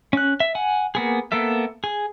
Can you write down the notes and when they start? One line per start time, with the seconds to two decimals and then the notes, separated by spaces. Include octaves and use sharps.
0.13 C#4 F#6
0.40 E5
0.55 F#5 G#5
0.95 A#3 B3 G#4
1.32 A#3 B3 A4 E5
1.84 G#4